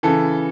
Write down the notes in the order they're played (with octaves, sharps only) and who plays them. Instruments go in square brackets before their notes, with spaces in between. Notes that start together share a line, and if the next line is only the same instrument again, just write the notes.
[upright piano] C#3 E3 A4